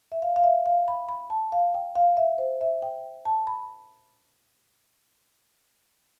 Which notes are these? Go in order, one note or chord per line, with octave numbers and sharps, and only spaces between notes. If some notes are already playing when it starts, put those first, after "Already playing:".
E5
F5
F5
E5
F5
B5
B5
A5
F5
G5
F5
E5
C5
E5
G5
A5
B5